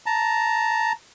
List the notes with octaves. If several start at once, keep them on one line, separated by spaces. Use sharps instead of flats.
A5 A#5